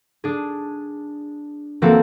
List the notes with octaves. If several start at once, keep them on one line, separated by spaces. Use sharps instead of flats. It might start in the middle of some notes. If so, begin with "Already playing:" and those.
D4 G#4
E3 A#3 C4 F#4 A4